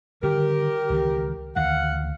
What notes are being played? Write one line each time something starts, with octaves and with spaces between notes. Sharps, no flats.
D3 D#3 G3 G4 A#4
C#2 D#3 E3
D2 D#3 E3 F5 F#5